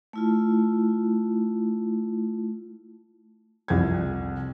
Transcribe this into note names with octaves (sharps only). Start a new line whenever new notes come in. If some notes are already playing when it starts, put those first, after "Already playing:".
A3 E4 F4
C2 F2 G#6